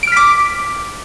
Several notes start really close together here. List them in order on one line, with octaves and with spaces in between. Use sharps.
D7 F6 B6 D6